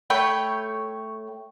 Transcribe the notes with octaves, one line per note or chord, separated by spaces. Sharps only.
A3 C#5 G5 B5